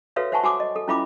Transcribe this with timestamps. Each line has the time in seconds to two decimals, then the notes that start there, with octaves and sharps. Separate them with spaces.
0.16 F#4 A4 B4 C#5 E5 F5
0.32 C5 E5 F#5 G#5 A5 C#6
0.43 F#4 G#5 D6 D#6
0.60 D#5
0.76 A4
0.88 C#4 E4 F4 E5 B5 D6